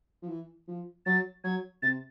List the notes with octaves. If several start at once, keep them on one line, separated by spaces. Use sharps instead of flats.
F3
E3
F3
F#3 A6
F#3 G#6
C3 A6